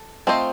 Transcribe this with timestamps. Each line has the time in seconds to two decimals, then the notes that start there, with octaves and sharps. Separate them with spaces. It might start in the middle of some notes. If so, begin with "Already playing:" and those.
Already playing: A4
0.27 A3 C4 F4 C5 D#5